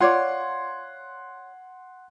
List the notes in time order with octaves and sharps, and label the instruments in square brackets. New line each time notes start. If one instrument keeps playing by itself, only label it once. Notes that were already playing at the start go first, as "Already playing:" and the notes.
[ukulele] F4 C#5 D5 [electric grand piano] F#5 C6 G#6